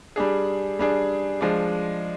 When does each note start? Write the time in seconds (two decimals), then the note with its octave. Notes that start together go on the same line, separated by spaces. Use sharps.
0.16 G3 D4 G#4
0.79 G3 D4 G#4
1.41 F3 G#3 D4